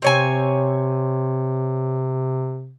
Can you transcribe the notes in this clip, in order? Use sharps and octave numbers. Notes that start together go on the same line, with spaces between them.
C3 C4 C#5 G#5